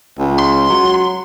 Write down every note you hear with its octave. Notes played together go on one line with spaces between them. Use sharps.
C#2
C6
F#3